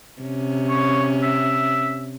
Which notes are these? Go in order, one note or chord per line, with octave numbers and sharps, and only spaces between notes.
C3 C#4
C#5
E5